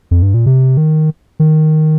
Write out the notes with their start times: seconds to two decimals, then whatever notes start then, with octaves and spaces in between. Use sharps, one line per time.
0.11 F2
0.22 G2
0.34 A#2
0.46 C3
0.77 D#3
1.40 D#3